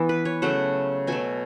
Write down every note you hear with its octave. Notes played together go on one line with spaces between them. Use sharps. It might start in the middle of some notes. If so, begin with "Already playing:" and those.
Already playing: E3 B3
B4
C#5
C#3 F#3 A3 F#5
B2 F#3 A3 G#5